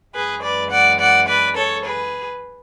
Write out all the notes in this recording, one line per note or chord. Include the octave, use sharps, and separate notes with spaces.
F#2 E3 G#3 G#4 B4
B4 D5
D5 F#5
D5 F#5
B4 D5
A4 C#5
G#4 B4